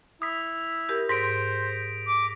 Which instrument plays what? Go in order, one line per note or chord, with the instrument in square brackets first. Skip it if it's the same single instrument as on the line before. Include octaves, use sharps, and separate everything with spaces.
[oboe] E4 [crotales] D#6 B6
[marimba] G4 A#4
[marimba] G#2 [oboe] C5 [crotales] A#6 B6 D7
[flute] D6